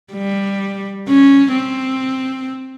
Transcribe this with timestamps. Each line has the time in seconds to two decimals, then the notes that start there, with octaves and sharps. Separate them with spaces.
0.13 G3
1.08 C#4
1.52 C4